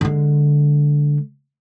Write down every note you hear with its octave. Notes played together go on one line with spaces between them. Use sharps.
D3 G#3